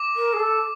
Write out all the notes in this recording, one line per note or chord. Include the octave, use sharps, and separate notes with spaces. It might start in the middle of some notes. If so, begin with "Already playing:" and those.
Already playing: D6
A#4
G#4
A4